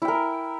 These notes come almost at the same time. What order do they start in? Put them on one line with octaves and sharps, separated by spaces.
E4 G5 A#4